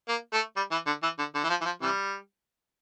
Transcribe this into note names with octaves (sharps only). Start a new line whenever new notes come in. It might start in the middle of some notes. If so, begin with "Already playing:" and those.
A#3
A3
G3
E3
D3
E3
D3
D3
E3
F3
E3
F3
C3 E3 G3